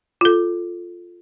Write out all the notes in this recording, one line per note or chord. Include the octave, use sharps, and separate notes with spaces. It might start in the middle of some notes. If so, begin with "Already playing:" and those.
F4 A4